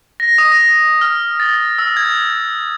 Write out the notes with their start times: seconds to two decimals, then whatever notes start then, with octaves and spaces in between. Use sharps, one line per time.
0.20 A#6
0.38 D#6
0.52 A#6
1.01 F6
1.40 A6
1.79 E6
1.97 G#6